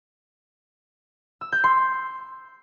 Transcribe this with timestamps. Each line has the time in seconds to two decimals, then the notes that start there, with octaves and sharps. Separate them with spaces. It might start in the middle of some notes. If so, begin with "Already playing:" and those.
1.41 E6
1.52 G6
1.64 C6